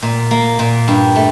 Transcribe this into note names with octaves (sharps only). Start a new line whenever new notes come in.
A#2
A#3
A#2
G2
A3